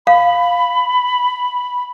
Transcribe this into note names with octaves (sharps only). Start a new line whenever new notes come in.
F5 B5